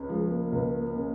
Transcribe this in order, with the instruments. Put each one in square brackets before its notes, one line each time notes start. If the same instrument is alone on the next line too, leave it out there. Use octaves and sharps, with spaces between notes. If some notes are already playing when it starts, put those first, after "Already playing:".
Already playing: [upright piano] C#2 C#3
[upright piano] F3 [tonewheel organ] G#3
[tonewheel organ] A#3
[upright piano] C#2
C#3